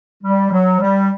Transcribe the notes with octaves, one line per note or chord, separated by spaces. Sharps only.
G3
F#3
G3